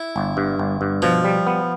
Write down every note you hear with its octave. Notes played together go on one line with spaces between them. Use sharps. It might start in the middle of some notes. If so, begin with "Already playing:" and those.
Already playing: E4
G1
G2
G1
G2
B2 F3
G3
B3